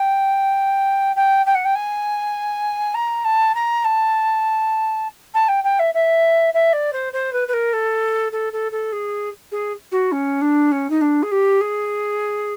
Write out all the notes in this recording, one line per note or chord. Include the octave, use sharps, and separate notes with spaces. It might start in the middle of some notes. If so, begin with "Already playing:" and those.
Already playing: G5
G5
G5
F#5
G5
G#5
A#5
A5
A#5
A5
A5
G5
G5
E5
E5
E5
D5
C5
C5
B4
B4
A#4
A4
A4
A4
A4
G#4
G#4
F#4
C#4
D4
C#4
D#4
D4
G#4
G4
G#4